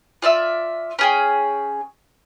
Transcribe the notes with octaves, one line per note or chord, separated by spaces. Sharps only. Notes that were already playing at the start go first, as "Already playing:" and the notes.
F4 D5 E5 E6
C#4 G#4 G5